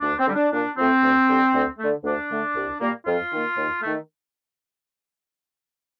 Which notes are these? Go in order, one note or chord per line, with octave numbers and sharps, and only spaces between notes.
D2 D4
C4
D3 G3
D4
A#2 D4
F3 A3 C4
D2
D3 G3
D2
D3 A3
D2 D4
D3 A3
C2
A#2 G3 A#3
F2 F4
D#3 A#3
D#2
D#3 A3